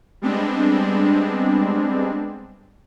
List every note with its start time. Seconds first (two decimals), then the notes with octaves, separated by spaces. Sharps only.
0.22 G3 G#3 B3 C4 D4